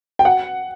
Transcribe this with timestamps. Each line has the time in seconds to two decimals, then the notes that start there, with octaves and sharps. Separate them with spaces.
0.19 G5
0.25 F#5